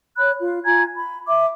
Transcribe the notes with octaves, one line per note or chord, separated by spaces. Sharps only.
C#5 B5 F#6
F4
F4 G#5 A#5 G#6
B5
E5 D6